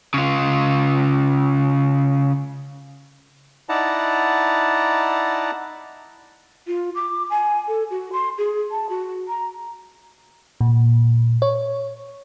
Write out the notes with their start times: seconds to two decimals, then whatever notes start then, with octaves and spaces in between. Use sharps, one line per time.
0.14 C#3 F4
3.69 D#4 E4 D5 F#5 A5 A#5
6.67 F4
6.95 D6
7.30 G#5
7.68 A4
7.90 F#4
8.13 C6
8.38 G#4
8.71 A5
8.89 F#4
9.28 A#5
10.61 A#2
11.42 C#5